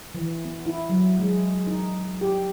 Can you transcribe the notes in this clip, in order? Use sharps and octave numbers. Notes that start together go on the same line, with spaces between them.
E3
B3
E4
F#3
G#3
D#4
G4